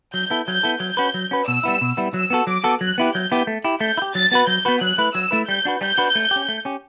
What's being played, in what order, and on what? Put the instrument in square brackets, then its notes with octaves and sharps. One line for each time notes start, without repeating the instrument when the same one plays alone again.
[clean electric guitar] F#3 [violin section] G6
[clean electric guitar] B3 E4 A4
[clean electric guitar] F#3 [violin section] G6
[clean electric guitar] B3 E4 A4
[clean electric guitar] F#3 [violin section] G6
[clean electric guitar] C#4 F#4 B4
F#3
C#4 F#4 B4
[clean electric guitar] B2 [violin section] E6
[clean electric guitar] G3 B3 E4
B2
G3 B3 E4
[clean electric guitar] F#3 [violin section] E6
[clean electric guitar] B3 F#4 A4
[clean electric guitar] F#3 [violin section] D6
[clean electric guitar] B3 F#4 A4
[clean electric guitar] F#3 [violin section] F#6
[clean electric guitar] B3 E4 G4
[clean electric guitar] F#3 [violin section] G6
[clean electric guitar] B3 E4 G4
A3
E4 G4
[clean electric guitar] A3 [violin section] G6
[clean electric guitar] E4
G4
[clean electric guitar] F#3 [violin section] A6
[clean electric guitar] B3 F#4 B4
[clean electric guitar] F#3 [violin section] G6
[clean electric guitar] B3 F#4 B4
[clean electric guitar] F#3 [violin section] F#6
[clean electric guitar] A3 E4 B4
[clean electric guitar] F#3 [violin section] E6
[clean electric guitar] A3 E4 B4
[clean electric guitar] G3 [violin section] G6
[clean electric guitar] D4 F#4 B4
[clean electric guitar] G3 [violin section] G6
[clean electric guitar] D4 F#4 B4
A3
C#4 G4
A3
C#4 G4